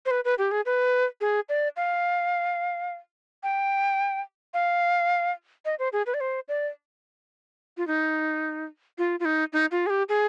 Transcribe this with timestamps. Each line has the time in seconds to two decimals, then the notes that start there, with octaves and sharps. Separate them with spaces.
0.06 C5
0.11 B4
0.25 B4
0.38 G4
0.51 G#4
0.66 B4
1.21 G#4
1.49 D5
1.77 F5
3.43 G5
4.54 F5
5.65 D#5
5.79 C5
5.93 G#4
6.06 B4
6.14 D5
6.21 C5
6.48 D5
7.77 F4
7.87 D#4
8.98 F4
9.20 F4
9.25 D#4
9.53 D#4
9.72 F4
9.86 G#4
9.90 G4
10.09 G#4